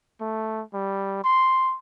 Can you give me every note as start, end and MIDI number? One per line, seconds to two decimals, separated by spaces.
0.21 0.63 57
0.74 1.22 55
1.24 1.76 84